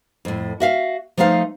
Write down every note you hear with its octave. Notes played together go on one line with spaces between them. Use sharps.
F2 A2
F#4 E5 F5
F3 A3 D#4 C5 F5